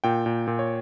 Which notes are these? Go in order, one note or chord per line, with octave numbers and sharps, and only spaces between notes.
A#2 G5
A#2
A#2
C#5